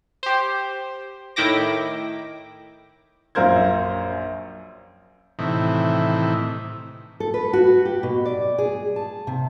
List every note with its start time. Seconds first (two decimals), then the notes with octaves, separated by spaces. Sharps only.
0.23 G4 C5
1.36 A2 D#3 E4 G5 D6 A#6
3.35 A#1 F#2 F4 A#4 C5 G#6
5.39 A2 C3 D#3 E3
7.20 A4
7.34 B4
7.53 F#4
7.85 G4
8.03 B2
8.25 D5
8.58 G#4
8.96 A5
9.27 C3